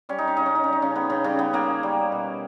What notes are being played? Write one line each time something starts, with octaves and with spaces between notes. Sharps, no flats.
G3 C#4
D#4
C#4
C#3 D#4
C#4
D#4
G3 C#4
D#4
C#3 C#4
C#3 B3
C#3 C#4
C#3 G3 C#4
B3
C#3 A#3
G3
B2